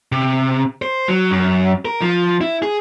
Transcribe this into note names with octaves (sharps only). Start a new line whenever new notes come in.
C3
C5
F#3
F#2
A#4
F3
E4
G#4